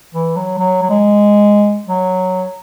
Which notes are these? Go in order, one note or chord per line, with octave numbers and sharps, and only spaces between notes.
E3
F#3
F#3
F#3
G#3
F#3